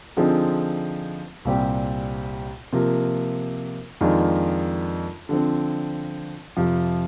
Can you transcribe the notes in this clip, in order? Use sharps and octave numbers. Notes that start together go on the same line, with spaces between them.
D3 F3 C4 D#4 G#4
C2 A#2 G3 C4 G4
C3 F3 A#3
F2 D#3 G#3 D4 F4
D3 F3 C4
F2 C3 F3